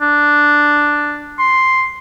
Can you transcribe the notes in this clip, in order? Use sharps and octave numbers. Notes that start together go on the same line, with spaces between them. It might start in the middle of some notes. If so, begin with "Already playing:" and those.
D4
C6